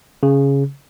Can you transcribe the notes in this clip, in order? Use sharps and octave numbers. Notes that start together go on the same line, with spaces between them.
C#3